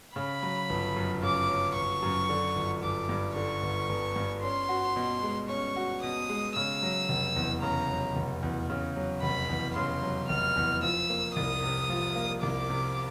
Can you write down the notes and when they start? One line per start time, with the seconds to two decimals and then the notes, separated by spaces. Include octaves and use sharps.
0.15 C#3 B5
0.43 F#3
0.69 G1
0.96 F#2
1.22 C#3 D6
1.49 F#3
1.75 G1 C#6
2.02 F#2
2.29 D3
2.56 G1
2.82 G1 D6
3.09 G2
3.36 D3 C#6
3.63 G1
3.89 G1
4.16 G2
4.42 C#4 C6
4.69 F#4
4.96 B2
5.23 G#3
5.49 C#4 C#6
5.76 F#4
6.02 B2 D#6
6.29 G#3
6.56 C#3 E6
6.83 F#3
7.09 F1
7.36 E2
7.62 C#3 A#5
7.89 F#3
8.16 F1
8.43 E2
8.70 C#3
8.96 F#3
9.22 F1 B5
9.49 E2
9.76 C#3 C6
10.03 F#3
10.29 F1 F6
10.56 E2
10.82 F3 E6
11.10 A#3
11.36 C2 D#6
11.62 C3
11.89 F3
12.16 A#3
12.42 C2 D6
12.70 C3